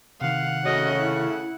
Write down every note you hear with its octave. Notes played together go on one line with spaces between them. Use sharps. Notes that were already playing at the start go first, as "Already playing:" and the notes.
C3 D#3 F5 F#5
C#3 A3 C#4 F#4 D#5
E4